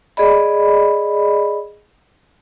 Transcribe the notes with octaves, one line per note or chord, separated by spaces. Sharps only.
G#4 D5 D#5 B5